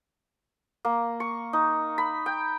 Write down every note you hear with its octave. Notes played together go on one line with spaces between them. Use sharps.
A#3
C#6
D#4
B5
G5